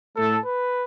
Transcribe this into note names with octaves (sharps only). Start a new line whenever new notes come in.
A2 A3 A4
B4